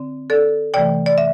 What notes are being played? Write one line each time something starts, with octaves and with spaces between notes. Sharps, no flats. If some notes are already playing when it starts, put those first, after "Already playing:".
Already playing: D3 C4
A4 D5
C3 E3 A3 D5 G5
D5
E5